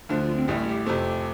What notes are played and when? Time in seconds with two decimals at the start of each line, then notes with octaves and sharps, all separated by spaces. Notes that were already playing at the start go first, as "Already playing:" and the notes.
0.09 D2 D3 F3 D4
0.22 F4
0.35 C4
0.48 A1 A2 G3 A3
0.67 G4
0.86 F2 C3 A3 C4